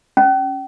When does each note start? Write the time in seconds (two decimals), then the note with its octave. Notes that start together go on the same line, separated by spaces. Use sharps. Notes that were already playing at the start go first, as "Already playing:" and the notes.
0.17 C#4